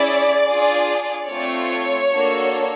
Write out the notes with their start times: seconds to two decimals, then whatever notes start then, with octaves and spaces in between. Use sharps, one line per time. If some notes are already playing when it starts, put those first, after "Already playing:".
Already playing: C#4 E4 G#4 D5
0.48 D4 F4 G#4
1.29 A3 C4 F4 C#5
2.12 A#3 D4 F#4 A4